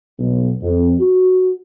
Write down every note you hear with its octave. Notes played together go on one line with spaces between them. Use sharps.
B1
F2
F#4